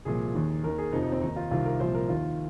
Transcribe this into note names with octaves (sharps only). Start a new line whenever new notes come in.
C2 A#2 F3 G#4
D#2 D#3
D#2 D#3 A#4
G#4
F2 C3 F3 D#4
D#4
C4
D#2 D#3 D#4
F4
C2 C3 D#3 F4
A#4
C2 A#2 F3 C5
A#4
D#2 D#3 F4